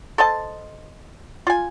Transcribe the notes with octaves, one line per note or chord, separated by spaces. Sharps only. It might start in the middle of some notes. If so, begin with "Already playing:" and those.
A4 C5 D#5 A5
F4 G#5